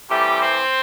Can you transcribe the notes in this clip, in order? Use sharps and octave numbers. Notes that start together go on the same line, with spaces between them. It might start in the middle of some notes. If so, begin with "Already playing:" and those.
C3 E3 G3 A3 G4
C4 C5